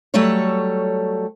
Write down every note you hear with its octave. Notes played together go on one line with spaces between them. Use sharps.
F#3 G3 A3 A4 C#5